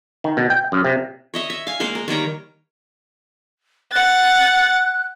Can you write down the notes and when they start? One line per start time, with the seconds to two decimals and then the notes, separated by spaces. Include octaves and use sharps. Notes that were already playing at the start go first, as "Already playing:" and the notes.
0.24 D#3
0.37 B2
0.50 G5
0.72 F#2
0.85 C3
1.34 C#5 D#5 E5
1.50 E5
1.67 F5 G#5
1.80 G#3 A#3 A#4 C5
1.95 A#4
2.08 D#3 G3 C#5 A#5
3.93 F#5 F#6 A6